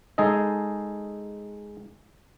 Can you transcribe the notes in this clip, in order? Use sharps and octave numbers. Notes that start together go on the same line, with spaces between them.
G#3 D#4 G#4 A4 D#5